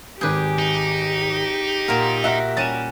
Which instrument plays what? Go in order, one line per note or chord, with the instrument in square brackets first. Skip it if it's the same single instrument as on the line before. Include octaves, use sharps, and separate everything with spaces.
[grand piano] G#1 D6 G6 [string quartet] G4 [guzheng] G#4 B4
[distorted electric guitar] D#4
[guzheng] A#2 F4 A#4 [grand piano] F#5
[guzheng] F#4 A#4 F#5 [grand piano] E5
[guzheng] G3 C#4 F#4 [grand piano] A6 D#7 E7